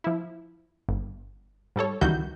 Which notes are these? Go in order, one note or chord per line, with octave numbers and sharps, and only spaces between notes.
F3 E4
G1
G#2 G3 A4 C#5
C#2 D#3 E3 G3 F#4 G6